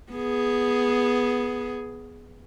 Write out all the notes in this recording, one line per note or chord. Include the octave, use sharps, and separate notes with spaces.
B3 G#4